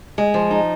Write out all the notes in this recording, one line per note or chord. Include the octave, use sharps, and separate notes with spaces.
G#3
F3
D#4